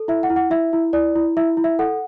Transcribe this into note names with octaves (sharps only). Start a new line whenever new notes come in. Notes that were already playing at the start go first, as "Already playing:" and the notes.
Already playing: A4
E4 E5
F#5
E4
F#5
E4 E5
E4
E4 D5
E4
E4 E5
E4
E5
A4 F#5